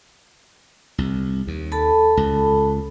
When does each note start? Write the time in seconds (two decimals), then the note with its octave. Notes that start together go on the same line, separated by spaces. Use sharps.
0.98 C2
1.47 D#2
1.72 A4 A5 B5
2.17 C#2